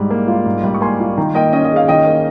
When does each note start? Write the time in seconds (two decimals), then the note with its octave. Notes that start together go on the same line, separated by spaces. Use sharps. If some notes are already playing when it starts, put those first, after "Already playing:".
Already playing: G#2 G3
0.10 A#3
0.28 F4
0.46 G#2
0.64 G3
0.74 C#6
0.81 A#3 G#5 C6
1.00 F4
1.17 D#3 G5 A#5
1.35 A#3 D#5 G5
1.53 C#4 D#5
1.65 D#5
1.70 G#4
1.76 F5
1.88 D#3 D#5 G5
2.06 A#3